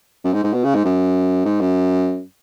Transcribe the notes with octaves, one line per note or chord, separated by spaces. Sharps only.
F#2
G#2
G#2
B2
C#3
G#2
F#2
G#2
F#2